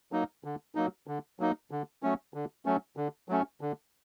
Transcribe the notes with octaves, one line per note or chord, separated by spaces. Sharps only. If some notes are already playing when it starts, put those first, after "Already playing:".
F#3 A#3 D#4
D3
F#3 A#3 D#4
D3
F#3 A#3 D#4
D3
F#3 A3 C#4
D3
F#3 A3 C#4
D3
F#3 A3 C#4
D3